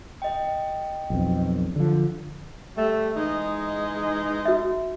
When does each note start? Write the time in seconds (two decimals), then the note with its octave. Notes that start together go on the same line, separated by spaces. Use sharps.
0.22 D#5 G5
1.10 B1 F2
1.76 D3 F3
2.77 G3 A3
3.17 E3 G#3 D#4
4.45 F#4 E5